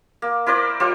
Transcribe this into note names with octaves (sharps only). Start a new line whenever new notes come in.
A#3
E4 A#4 C5 D5
G3 F4 C5